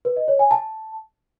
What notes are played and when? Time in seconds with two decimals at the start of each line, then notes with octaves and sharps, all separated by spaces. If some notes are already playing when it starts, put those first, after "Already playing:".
0.05 B4
0.16 D#5
0.28 C#5
0.39 G#5
0.51 A5